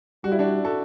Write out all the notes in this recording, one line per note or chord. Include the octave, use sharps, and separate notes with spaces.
G3 F#4
E4
D4 F#4
F#4 A4